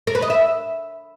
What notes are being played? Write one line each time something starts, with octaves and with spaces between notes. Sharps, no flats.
A#4
B4
D#5
E5